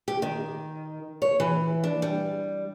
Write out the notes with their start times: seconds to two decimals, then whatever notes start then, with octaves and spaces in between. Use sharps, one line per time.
0.08 G4
0.22 D#3
1.22 C#5
1.40 E3
1.84 D4
2.02 G3